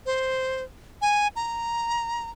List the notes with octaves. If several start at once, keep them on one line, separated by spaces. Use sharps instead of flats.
C5
G#5
A#5